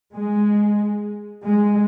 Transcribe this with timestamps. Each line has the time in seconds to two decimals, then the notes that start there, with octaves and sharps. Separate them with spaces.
0.13 G#3
1.45 G#3